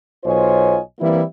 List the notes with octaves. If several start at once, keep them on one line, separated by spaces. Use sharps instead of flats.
B1 F4 C5 C#5 D#5 G#5
E3 G3 A#3 C4 E4